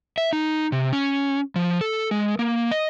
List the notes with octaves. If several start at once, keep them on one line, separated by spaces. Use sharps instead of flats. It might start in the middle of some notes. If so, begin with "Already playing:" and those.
E5
D#4
C3
C#4
F3
A4
G#3
A#3
D#5